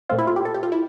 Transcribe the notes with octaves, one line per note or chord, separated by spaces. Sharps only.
A#2 A3 C4 F4
E4
F4
G4
A4
G4
F4
E4